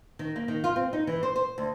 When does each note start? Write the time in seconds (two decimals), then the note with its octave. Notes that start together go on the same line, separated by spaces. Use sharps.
0.19 D#3
0.36 A#3
0.48 D#3
0.64 F4
0.76 C4
0.93 D#4
1.07 E3
1.23 C5
1.36 C5
1.58 D2